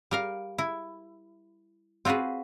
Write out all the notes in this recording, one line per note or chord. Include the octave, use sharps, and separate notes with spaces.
G3 A#4 F5
E4
C4 F4 F#4 G#4 B4